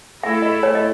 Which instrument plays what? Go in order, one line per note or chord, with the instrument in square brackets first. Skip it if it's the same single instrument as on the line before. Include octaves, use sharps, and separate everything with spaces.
[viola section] A3 E4 A4 [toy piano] E5
[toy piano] D#5
C#5
D#5